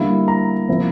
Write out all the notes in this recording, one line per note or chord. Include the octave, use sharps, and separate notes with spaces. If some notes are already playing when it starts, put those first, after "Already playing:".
Already playing: D3 G3 A#3 E4
A#5
C3 F3 A#3 E4